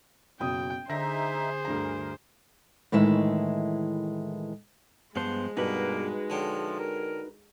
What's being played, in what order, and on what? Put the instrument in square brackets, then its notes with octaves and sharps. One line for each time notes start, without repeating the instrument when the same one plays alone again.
[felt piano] F#1 B2 D#6 [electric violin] G5
[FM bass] D3 [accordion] D#4 E5 [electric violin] G#4 C5 [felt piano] A#6
[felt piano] D2 G2 A#5 [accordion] A#4
[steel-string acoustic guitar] A2 D#3 E3 G#3 E5
[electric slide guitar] G2 B3 C5 [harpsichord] F3 [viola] G#3
[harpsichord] G2 B2 [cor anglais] A#3 [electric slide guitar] D#4 F#4 B4
[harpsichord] D3 C#5 G5 [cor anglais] F3
[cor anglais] A#4